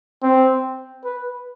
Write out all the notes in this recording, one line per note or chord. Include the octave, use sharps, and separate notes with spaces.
C4
B4